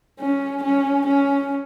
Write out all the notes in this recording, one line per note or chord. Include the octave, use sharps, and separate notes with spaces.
C#4
C#4
C#4